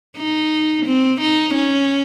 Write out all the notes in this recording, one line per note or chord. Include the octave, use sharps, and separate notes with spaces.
D#4
C4
D#4
C#4